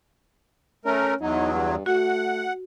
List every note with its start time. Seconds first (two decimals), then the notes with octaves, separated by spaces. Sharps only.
0.85 A3 C#4 A#4
1.21 E2 F#3 D#4
1.53 G2
1.86 A3 F#4 F#5